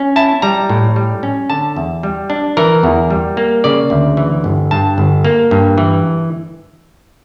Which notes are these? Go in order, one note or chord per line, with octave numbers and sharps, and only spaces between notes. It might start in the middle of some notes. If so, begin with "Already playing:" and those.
Already playing: C#4
E4 A5
G3 A#5
A2
G3
C#4
D3 A5
E2
G3
D4
E3 A#4
E2
G3
A#3
C#3 D5
D2
E3
G1
G2 A5
G1
A#3
G2
E3